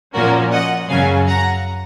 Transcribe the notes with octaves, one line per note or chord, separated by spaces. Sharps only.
A#2 F3 A#3 C#4 F#4 A#4
D#5 F#5
F#2 C#3 F#3 C#4 F5 G#5
F#5 A#5